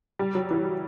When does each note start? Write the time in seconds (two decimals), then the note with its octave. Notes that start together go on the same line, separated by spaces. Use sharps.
0.19 G3
0.35 F#3
0.51 E3